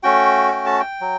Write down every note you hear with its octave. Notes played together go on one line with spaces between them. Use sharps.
A3 C#4 F#4 G5
G5
A5
G5
F#3